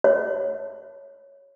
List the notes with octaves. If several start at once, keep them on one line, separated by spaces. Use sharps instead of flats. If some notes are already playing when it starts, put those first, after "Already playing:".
C#5